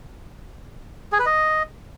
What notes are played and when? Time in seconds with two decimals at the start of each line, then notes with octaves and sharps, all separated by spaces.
1.12 G#4
1.19 B4
1.26 D#5